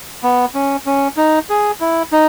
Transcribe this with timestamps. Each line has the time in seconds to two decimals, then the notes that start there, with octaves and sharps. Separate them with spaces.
0.23 B3
0.54 C#4
0.86 C#4
1.17 D#4
1.49 G#4
1.81 E4
2.12 D#4